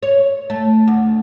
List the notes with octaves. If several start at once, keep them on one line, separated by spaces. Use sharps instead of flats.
C#5
A3
D2